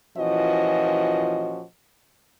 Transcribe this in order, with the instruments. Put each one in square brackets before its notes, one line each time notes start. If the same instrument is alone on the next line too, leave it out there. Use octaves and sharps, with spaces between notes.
[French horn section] A#2 E3 F3 C#4 F#4 D#5